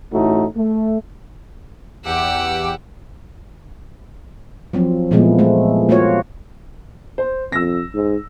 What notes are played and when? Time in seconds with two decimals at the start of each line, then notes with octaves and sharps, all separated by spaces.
0.13 A1 A2 A3 D#4 F#4
0.57 A3
2.04 E2 G4 F#5 D6 E6
4.73 F3 F#3 C4
5.11 A#2 E3 F3 G#3 A3 B3
5.39 G#3 A3
5.89 A3 A#3 F4 F#4 C#5
7.18 C5
7.52 F2 E6 A#6
7.95 G#2